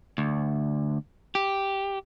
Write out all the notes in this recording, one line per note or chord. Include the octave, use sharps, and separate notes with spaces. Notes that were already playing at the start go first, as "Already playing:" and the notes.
D2
G4